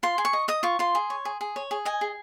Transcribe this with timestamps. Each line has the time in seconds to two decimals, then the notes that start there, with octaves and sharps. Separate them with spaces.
0.03 F4 C6
0.18 G#4
0.25 C#6
0.33 D#5
0.48 D#5 D#6
0.63 F4 C#6
0.79 F4 C6
0.95 G#4
1.10 C#5
1.25 G#4
1.41 G#4
1.56 C#5
1.71 G#4
1.85 D#5 G#5
2.01 G#4